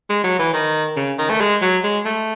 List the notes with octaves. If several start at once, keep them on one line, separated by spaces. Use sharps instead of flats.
G#3
F#3
E3
D#3
C#3
D#3
A3
G#3
F#3
G#3
A3